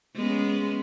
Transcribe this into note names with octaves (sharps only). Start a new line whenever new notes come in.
G#3 B3 C#4